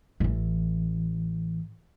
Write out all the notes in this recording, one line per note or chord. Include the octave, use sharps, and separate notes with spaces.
A1 E3